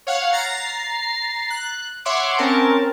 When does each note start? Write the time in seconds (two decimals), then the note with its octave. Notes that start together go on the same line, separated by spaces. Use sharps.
0.07 C#5 F5 F#5
0.32 A#5 A6 C7
1.50 F#6
2.05 C#5 E5 F#5 C6 D6
2.38 C4 C#4 A#4 A5